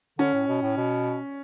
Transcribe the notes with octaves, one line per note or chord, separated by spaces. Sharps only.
D3 C#4
A2
B2
A2
B2